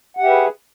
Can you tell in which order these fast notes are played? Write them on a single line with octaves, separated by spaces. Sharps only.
F#5 G4 E5 B4 G#4